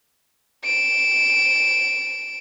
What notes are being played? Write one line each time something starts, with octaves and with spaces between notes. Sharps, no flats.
D7 E7